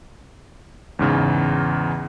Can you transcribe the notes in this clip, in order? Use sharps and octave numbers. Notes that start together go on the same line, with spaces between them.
E2 G#2 C#3